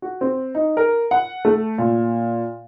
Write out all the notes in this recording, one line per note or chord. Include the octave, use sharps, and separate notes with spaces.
F#4
C4
D#4
A#4
F#5
A3
A#2